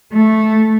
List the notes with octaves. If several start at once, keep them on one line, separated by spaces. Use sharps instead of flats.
A3